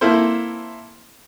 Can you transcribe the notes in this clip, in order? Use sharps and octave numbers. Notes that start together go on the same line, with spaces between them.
A#3 C4 E4 A4 C5